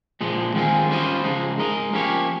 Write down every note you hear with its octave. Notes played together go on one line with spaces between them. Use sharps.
A#2 F3 G#3
D#3 G#3 C4 F4 G#4
G3 C#4 F4 C5 D#5
C#3 F3 G#3 D#4
G#3 D#4 A#4 D#5
F3 A#3 C#4 G4 C#5